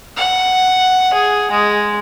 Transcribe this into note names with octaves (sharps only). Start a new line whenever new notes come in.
F#5
G#4
G#3